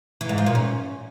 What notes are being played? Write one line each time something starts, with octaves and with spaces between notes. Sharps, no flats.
E3
G#2
F3
A#2
C#4